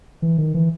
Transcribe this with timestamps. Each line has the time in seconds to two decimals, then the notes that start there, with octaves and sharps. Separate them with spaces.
0.22 E3
0.38 D#3
0.54 E3